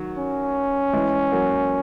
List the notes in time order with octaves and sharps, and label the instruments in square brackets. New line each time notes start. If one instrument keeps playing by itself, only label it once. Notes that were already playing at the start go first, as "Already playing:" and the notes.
Already playing: [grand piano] D#3 F#3
[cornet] C#4
[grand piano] E3 G#3
F#3 A#3